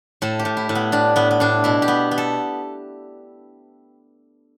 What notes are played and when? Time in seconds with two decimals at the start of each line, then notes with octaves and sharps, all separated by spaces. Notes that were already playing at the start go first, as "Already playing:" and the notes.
0.22 A2 A4
0.39 G4
0.45 A2
0.57 E4
0.69 A2
0.75 B3
0.92 A2 D4
1.16 A2 B3
1.31 B3
1.40 A2 D4
1.64 B2 E4
1.82 G4
1.88 B3
2.11 B3
2.18 A4